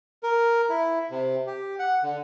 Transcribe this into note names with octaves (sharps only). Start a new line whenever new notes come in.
A#4
E4
C3
G4
F#5
D3